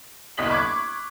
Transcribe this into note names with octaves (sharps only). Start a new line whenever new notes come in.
G1 C2 D#5 B6 F#7
B5 C#6 D6 F#6 G#6